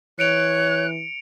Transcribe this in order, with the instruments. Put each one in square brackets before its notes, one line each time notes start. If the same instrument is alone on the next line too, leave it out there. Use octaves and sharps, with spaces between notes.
[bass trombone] E3 [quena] C#5 [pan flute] F#6 [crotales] C#7 D7 F7